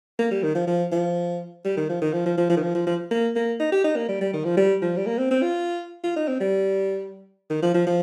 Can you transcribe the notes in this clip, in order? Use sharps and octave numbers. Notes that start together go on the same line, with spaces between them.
A#3
G3
D#3
F3
F3
F3
G3
D#3
F3
D#3
F3
F3
F3
F3
D#3
F3
F3
F3
A#3
A#3
D#4
G4
D#4
A#3
G3
G3
D#3
F3
G3
F3
G3
A#3
C4
C4
F4
F4
D#4
C4
G3
D#3
F3
F3
F3